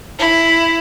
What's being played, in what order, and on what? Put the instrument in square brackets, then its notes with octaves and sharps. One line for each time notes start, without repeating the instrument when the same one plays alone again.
[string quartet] E4